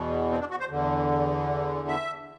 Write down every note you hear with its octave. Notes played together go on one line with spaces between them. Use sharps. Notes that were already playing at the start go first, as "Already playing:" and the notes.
Already playing: E2 B2
C4
D4
F#4
C5
E2 D3
E5